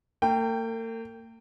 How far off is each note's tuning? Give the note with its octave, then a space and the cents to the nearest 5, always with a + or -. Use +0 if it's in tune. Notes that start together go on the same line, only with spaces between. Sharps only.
A#3 -45 G5 +0